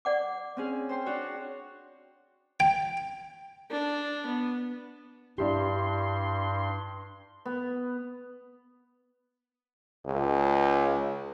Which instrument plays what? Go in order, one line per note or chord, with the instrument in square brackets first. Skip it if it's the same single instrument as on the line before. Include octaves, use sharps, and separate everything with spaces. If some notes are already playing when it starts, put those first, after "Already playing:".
[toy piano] D5 F#5 D6
[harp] C4 C#4 G#4
C5 G5 C6
D4 F#4 C#5
[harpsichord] G5
[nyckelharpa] D4
B3
[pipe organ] G2 C6 [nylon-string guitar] D4 E4 G4
[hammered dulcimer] B3
[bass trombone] C#2